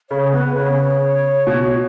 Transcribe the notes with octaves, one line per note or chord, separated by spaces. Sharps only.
C#3 C#5
B3 B4
C#3 C#5
B2